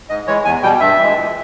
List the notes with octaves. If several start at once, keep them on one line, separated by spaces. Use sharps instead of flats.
G#2 D#5
E3 G#3 C#5
E2 G#5
B2 G3 G5
G2 E5
E3 G#3
A#2